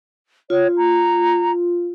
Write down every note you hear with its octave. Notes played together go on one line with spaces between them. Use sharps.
F4 C#5
A#5